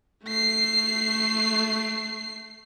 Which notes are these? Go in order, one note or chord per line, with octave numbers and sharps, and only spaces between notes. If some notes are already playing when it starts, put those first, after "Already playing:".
A3 C7